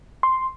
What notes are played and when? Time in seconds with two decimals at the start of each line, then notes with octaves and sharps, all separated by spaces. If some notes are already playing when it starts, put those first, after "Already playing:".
0.23 C6